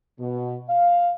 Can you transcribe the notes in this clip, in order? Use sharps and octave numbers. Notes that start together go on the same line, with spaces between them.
B2
F5